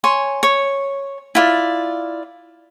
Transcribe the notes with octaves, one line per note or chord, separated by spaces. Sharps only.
C#5 G#5 C6
C#5
E4 F4 D5